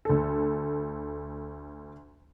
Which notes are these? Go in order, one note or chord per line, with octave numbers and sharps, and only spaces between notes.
D2 A4